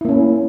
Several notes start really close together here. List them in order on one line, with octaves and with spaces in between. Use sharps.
E4 A#3 C#4